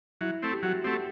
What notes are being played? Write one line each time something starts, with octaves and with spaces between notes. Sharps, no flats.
F#3 E4
A3 C4
G4
F#3 F#4
A3 C4 G4